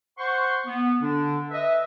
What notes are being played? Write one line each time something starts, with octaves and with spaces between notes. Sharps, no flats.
C5 F#5 C6 C#6
B3
D3 D4
B4 D#5 E5